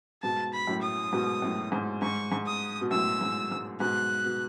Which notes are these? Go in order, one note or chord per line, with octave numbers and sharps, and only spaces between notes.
G#2 B2 A5
B5
F#2 A2
D#6
G#2 B2
F#2 A2
G#2
G#2 C#6
G#2
D#6
B2
F#2 A2 E6
G#2
G#2
G#2 B2 F#6
B2